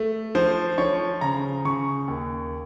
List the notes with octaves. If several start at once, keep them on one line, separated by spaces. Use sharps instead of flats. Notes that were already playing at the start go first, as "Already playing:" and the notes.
Already playing: A3
F3 C5
F3 C#5
C#3 A#5
C#3 C#6
D#2